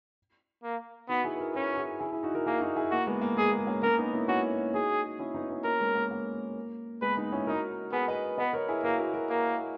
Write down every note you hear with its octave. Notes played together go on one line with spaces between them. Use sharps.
A#3
B3 D#4 F#4
E4 G#4
B4
F#4 A#4
C#4 F#4 A#4
E4 G#4
E4 G#4
E4 G#4
D#4 F#4
F#4 A#4
A#3 E4 G#4
D#4 F#4
E4 G#4
A#3 F#4
G#3 B3
A#3
G#3 G#4
A#3
A#3 C#4
A#3 C#4 A#4
B3 D#4
C#4 E4
C#4 E4 F#4
D#4 F#4 G#4
C#4 E4
B3 D#4
B3 D#4
A#3 C#4 A#4
G#3 B3
A#3
A#3
G#3 B3 B4
B3 D#4
C#4 E4
D#4 F#4 A#4
B3 G#4 B4
B4 D#5
B3 B4 D#5
A#4 C#5
E4 G#4
A#3 F#4 A#4
F#4 A#4
F#4 A#4
A#3